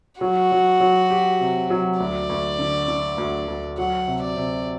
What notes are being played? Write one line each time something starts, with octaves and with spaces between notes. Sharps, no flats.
F#3 F#4
F#3
F#3
G4
C3
F#3
D2 D5
D2
D3
D3
D2
D2
F#3 F#5
C3
D5
C3